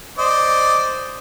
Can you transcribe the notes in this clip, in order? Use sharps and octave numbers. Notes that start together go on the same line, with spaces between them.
C5 D5 D#5